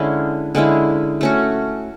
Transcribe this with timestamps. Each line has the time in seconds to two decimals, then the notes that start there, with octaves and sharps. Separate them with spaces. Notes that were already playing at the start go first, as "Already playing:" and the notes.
Already playing: D3 G#3 C#4 E4
0.55 D3 G#3 C#4 E4
1.21 A3 C#4 F#4